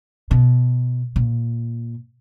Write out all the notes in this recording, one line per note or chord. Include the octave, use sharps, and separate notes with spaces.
B2
A#2